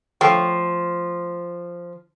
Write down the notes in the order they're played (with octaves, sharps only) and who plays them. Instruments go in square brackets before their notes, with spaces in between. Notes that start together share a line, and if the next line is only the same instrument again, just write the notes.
[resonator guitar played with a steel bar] F3 [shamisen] A3 C#5 G5